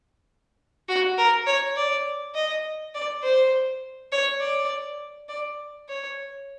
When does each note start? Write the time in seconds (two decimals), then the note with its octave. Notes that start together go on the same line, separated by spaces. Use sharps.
0.89 F#4
1.18 A#4
1.47 C#5
1.76 D5
2.35 D#5
2.95 D5
3.23 C5
4.12 C#5
4.41 D5
5.29 D5
5.88 C#5